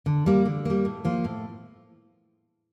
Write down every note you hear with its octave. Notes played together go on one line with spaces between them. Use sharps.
D3
G3 A#3
D3
G3 A#3
A2
F3 A#3 F4
A2